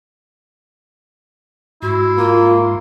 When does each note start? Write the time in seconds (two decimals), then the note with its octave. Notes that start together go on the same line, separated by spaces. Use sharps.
1.82 G#2 E4 F#4 C6
2.17 A#3 F4